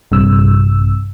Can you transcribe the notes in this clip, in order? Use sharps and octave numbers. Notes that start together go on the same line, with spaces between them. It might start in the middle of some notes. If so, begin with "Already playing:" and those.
A#1 G2 C3 E6